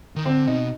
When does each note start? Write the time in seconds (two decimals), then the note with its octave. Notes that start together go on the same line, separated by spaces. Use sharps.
0.16 D#3
0.26 D3 C4
0.47 B2 D#4